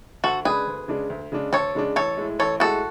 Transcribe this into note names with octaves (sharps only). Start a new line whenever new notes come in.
D2 F#4 A4
C#3 G#3 D4 G#4 B4
D2
C#3 G#3 D4
D2
C#3 G#3 D4
D2 A4 C#5
C#3 G#3 D4
A1 A4 C#5
A2 G#3
A1 A4 C#5
A2 G#3 F#4 A4